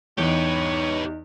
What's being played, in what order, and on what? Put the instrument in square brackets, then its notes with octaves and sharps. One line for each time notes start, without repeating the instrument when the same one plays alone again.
[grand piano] E2 [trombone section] D#4 [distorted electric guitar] G4 B4 [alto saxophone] C#5